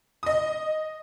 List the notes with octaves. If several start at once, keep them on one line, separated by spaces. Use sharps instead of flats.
D#5 D#6